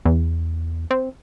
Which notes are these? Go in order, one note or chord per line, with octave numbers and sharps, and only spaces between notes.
E2
C4